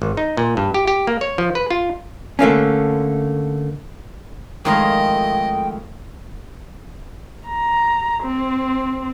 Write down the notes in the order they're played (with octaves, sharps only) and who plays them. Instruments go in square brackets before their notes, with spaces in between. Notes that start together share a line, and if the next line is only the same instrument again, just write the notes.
[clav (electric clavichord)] G#1
D#4
A#2
G2
G4
G4
A#3
C#5
F3
B4
F4
[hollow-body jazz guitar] D3 A3 A#3 C#4
[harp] F2 A2 G#3 [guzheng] D#3 F4 A#5 [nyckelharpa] D#5 [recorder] G5
[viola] A#5
C4